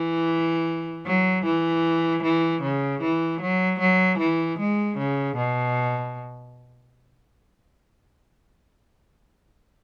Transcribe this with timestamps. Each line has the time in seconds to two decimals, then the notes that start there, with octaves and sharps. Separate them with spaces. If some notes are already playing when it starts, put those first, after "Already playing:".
Already playing: E3
1.06 F#3
1.45 E3
2.23 E3
2.62 C#3
3.02 E3
3.41 F#3
3.80 F#3
4.19 E3
4.59 G#3
4.98 C#3
5.37 B2